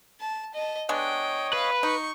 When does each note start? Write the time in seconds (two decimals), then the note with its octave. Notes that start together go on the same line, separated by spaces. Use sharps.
0.20 A5
0.54 D#5 A5
0.89 G#3 B3 D4 C#5 D#5 G5
1.53 B4 F5
1.83 D#4 C#6